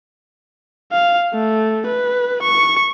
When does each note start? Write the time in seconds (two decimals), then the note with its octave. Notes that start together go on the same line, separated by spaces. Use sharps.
0.92 F5
1.34 A3
1.87 B4
2.43 C#6